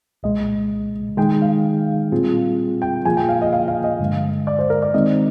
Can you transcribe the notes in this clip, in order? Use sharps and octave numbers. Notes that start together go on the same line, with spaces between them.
C2 A#2 G#3 D#5
D#3 G#3 D#4 G#4 G5
F5
A#2 G3 C4 F4 G#4
G5
A#2 F3 A#3 F4 G#4 G#5
G5
F5
D#5
F5
F5
D#5
G2 D3 G#3
D5
C5
A#4
D5
D#3 G#3 C4 D#4 D#5